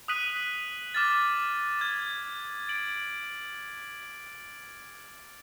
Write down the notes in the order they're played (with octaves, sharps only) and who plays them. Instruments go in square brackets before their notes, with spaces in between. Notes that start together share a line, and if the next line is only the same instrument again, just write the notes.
[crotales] D#6 F#6 B6 D#7 F#7
D6 F6 A6
D6 F6 G#6
A6 D7 F#7